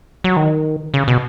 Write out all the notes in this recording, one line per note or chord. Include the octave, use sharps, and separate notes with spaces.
F#3
D#3
C#3
B2